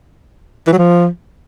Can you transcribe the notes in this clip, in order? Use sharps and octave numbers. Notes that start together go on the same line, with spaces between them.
E3
F#3
F3